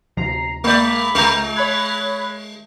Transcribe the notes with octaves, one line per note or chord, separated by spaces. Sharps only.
D2 C3 F3 A#5 C7
G#3 A#3 D5 B5
C#2 G#3 A#5
C#5 B5 F#6 G#6